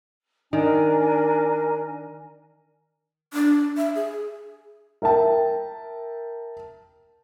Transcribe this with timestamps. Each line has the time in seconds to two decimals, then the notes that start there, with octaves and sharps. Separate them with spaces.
0.53 D#3 D4 A#4 G#5
3.34 D4
3.77 E5
3.95 G#4
5.02 A#4 E5 G5 A5